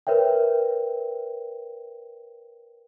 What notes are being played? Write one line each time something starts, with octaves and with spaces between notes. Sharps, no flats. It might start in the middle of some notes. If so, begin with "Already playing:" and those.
A#4 B4 C#5 E5 G5